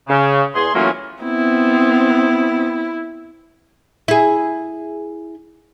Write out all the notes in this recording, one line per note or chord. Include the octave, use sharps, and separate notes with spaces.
C#3
E2 G#4 C6
E3 F#3 A3 A#3 C#4 F4
B3 C4 E4
E4 G#4